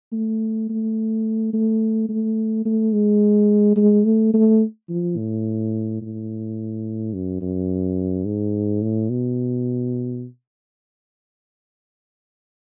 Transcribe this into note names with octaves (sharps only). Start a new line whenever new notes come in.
A3
A3
A3
A3
A3
G#3
G#3
A3
A3
F3
A2
A2
F#2
F#2
G#2
A2
B2